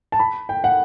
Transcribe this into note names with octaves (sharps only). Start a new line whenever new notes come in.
A5
B5
G5
F#5